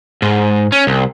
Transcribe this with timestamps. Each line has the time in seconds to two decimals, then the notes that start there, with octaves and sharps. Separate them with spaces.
0.22 G#2
0.72 C#4
0.87 C2